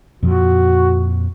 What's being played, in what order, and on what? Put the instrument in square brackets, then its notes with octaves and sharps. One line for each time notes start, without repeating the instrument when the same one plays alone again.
[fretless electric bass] F2 A#2 F3 [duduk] F#4